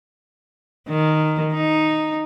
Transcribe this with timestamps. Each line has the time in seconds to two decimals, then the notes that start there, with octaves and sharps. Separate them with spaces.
0.88 D#3
1.53 D#4